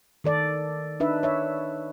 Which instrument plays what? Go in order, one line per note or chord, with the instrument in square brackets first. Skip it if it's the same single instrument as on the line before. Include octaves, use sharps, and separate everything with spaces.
[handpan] D#3 A4 D5
D4 D#4 B4 E5
C#5 E5